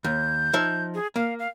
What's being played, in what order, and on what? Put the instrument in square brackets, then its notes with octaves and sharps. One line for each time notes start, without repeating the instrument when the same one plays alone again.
[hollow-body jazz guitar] D#2 [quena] G6
[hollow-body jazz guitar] F3 D#4 E5
[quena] G#4
[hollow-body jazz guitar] A#3 [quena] F5
[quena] F5